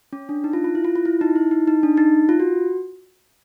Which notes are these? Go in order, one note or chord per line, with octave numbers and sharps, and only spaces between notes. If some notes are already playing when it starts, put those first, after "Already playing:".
C#4
D4
D#4
F4
F4
E4
F4
F4
E4
D#4
E4
D#4
D#4
D4
D#4
F4
F#4